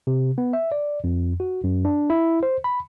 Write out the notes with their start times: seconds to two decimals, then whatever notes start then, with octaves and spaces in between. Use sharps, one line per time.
0.07 C3
0.38 B3
0.53 E5
0.72 D5
1.04 F2
1.40 F#4
1.64 F#2
1.85 D4
2.10 E4
2.43 C5
2.64 B5